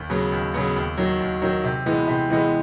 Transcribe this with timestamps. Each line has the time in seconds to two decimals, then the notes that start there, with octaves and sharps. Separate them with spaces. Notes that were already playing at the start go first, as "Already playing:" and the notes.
Already playing: D#2
0.10 C#3 F#3 B3
0.32 D#2
0.54 C#3 F#3 B3
0.76 D#2
0.97 D#3 F#3
1.20 D#2
1.42 D#3 F#3
1.64 C3
1.86 E3 G#3 B3
2.08 C3
2.30 E3 G#3 B3